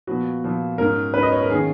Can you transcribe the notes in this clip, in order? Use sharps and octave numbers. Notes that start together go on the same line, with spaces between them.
A#2 F3 B3 F#4
A#2 F3 B3
G#2 F#3 C#4 A#4
G#2 F#3 C#4 B4
D#5
C#5
A#4
D#3 A#3 C#4 G#4